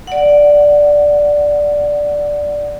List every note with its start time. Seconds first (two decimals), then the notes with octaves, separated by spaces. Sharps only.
0.07 D5 F#5